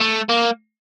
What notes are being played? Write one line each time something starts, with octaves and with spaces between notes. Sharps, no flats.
A3
A#3